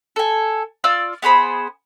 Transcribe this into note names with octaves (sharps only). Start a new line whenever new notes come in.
A4 G#5
F4 D5 E6 F6
B3 G#4 C5 B5